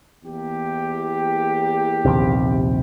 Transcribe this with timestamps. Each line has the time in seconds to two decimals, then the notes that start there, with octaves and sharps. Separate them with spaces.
0.24 E2 A#3 G4
2.05 A#1 D#2 C3